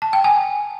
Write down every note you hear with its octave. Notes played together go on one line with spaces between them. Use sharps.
A5
G5
G#5